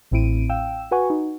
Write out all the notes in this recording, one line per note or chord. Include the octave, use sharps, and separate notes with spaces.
A1 A2 C4 E4 D7 D#7
F5 G5 E6 E7
F#4 B4 F#5 G#5 C#6
D#4